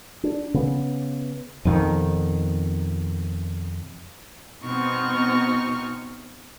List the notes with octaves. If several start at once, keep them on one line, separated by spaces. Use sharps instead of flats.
D4
C#3 B3
F2 B2 D#3
B2 B3 C4 D#4 C#6 F6